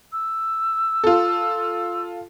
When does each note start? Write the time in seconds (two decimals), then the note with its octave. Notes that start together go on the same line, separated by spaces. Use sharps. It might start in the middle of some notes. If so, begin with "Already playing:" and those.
0.13 E6
1.04 F4 A4